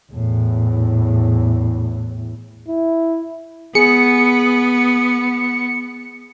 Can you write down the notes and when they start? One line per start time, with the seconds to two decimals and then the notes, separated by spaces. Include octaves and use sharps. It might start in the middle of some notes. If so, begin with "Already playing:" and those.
0.13 E2 A2
2.68 E4
3.75 B3 G#4 C#7